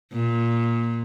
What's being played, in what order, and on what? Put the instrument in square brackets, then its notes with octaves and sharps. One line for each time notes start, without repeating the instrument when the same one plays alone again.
[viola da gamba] A#2